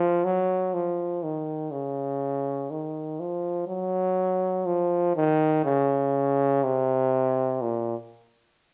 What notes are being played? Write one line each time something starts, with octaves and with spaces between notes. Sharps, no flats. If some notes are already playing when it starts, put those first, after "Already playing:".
Already playing: F3
F#3
F3
D#3
C#3
D#3
F3
F#3
F3
D#3
C#3
C3
A#2